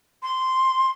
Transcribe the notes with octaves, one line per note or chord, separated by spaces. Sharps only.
C6